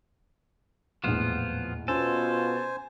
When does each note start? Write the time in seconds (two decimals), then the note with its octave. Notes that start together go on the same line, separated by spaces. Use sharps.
1.04 D#1 A1 E2 F3 B3 F4
1.88 B2 B3 C#4 F4 A4 C5 G#5